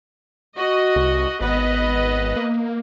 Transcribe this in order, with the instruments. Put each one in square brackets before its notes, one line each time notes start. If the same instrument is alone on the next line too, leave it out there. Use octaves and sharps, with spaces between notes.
[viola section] F#4 D#5
[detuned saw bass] C2
[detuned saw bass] G#1 [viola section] B3 B4 D#5
[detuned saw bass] A#3